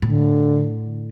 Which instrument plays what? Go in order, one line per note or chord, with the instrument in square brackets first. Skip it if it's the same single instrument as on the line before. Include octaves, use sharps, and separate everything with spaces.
[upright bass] A2 [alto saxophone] D3